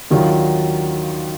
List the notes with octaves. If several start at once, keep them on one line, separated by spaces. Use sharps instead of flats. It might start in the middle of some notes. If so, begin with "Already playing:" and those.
D#2 D#3 F#3 D4 F4